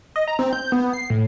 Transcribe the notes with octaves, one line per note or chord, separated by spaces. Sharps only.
D#5
A#5
C4
G6
B3
C7
A2